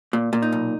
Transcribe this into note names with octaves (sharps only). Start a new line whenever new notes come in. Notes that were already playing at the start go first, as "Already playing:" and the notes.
A#2
A#2
D#4
B1